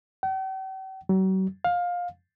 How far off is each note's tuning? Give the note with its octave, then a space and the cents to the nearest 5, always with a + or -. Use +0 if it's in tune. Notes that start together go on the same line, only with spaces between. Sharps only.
G5 -45
F#3 +40
F5 +20